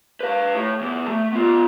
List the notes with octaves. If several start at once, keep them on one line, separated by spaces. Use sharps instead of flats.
B4 F5
A2
E2
A3
B3 F4